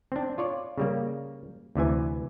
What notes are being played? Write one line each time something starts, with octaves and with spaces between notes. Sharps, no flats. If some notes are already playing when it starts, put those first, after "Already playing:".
C4 D4
F4 C#5 D5
C#3 G3 A#3
D2 C3 E3 G#5